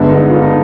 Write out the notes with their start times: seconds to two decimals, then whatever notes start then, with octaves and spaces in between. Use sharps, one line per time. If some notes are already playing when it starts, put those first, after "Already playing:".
Already playing: G1 G2 D3 G#3 B3
0.09 D#4
0.29 F4
0.42 D#4